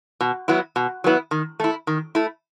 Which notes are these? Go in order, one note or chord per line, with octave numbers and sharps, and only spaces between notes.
B2
F#3 B3 E4
B2
F#3 B3 E4
D#3
A3 E4
D#3
A3 E4